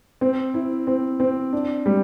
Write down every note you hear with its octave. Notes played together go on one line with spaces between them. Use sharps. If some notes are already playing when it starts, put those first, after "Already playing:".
C4
E4
C4
C4
D4
G3